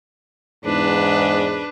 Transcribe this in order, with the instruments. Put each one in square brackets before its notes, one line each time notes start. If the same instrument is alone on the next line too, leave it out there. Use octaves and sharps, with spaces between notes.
[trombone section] E2 G#2 [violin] D4 B4